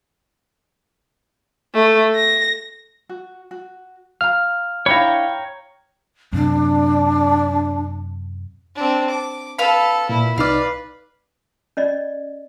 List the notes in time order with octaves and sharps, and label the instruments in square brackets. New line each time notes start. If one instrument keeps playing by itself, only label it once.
[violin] A3
A#6
[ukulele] F#4
F#4
[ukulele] F5 A#5 [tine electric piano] F6
[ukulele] D4 E4 F5 [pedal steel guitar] C#5 G5 A#5 [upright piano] B5
[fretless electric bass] F#2 C3 [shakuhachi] D4
[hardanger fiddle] C4 D4
D6
[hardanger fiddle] A4 [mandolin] B4 F5 B5
[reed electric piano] A#2 [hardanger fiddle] E4
[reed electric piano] C2 D#4 F6 [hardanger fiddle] B4 [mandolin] D5 F5
[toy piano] C#4 D5 D#5